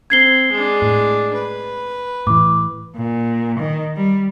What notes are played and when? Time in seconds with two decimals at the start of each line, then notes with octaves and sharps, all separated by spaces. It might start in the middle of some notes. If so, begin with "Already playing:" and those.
0.10 C4 G#6 C7 G7
0.52 G#3 D4
0.82 A2
1.34 B4
2.27 A2 E3 D6
2.96 A#2
3.59 D#3
3.96 G3